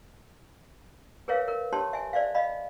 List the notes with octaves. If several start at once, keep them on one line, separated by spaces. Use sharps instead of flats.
G#4 A#4 B4 C#5 E5 F5
A#4
C#4 G4 C5 C#5 A5 C6
E5 G#5
C5 D5 E5 F5
D#5 F5 B5